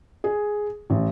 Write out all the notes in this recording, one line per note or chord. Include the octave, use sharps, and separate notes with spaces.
G#4
A1